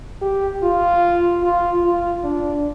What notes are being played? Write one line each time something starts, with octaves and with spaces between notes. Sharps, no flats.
G4
F4
F4
F4
D4